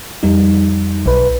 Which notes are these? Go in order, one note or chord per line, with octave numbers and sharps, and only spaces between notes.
F2 G3 D#4
B1 B4